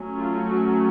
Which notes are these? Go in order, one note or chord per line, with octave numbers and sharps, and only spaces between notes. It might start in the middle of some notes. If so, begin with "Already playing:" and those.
Already playing: F#3 A3 C#4
F4
F#4